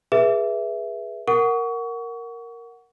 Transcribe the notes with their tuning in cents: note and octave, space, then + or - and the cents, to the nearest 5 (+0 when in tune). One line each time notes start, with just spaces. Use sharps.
G#4 +0 B4 -25 E5 +10
A#4 +0 F#5 +0 C#6 +30